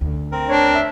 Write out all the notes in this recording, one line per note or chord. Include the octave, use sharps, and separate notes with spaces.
D2 C#3
C4 A#4
D4 C#5
E5